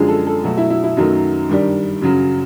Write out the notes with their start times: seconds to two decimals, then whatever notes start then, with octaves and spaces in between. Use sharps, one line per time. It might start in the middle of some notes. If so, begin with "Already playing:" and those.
Already playing: F#2 D3 F3 G#3 G#4
0.08 A4
0.27 A4
0.44 B2 F#3 A3 A4
0.57 E4
0.70 E4
0.83 E4
0.97 F#2 D#3 F#3 A3 D#4
1.49 G2 D#3 G3
2.02 F#2 C#3 F#3